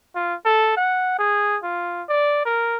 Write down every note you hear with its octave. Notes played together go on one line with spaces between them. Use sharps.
F4
A4
F#5
G#4
F4
D5
A#4